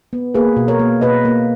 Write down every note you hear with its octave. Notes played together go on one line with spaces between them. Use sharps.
B3
A#3 G#4 B4
B2
A#4 C#5
A#3
B2 B4 D#5
A#3